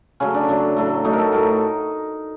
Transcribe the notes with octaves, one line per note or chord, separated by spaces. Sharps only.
C#3 F#3 A3 C#4
D4
C#3 F#3 A3
A2 F#3 A3
A2 F#3 A3 D#4
A#4
A4
A2 F#3 A3 A#4